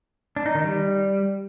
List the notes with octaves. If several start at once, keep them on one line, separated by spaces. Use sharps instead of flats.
D4
D#4
D#3
G3